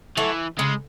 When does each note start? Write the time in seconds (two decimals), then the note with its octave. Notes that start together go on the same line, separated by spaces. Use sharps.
0.17 E3 F#3 A3
0.58 C#3 G#3